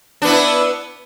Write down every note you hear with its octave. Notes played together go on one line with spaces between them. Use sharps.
B3 D4 E4